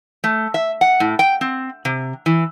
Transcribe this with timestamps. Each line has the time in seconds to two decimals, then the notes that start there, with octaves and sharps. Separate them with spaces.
0.24 A3
0.54 E5
0.81 F#5
1.00 A2
1.19 G5
1.41 C4
1.85 C3
2.26 E3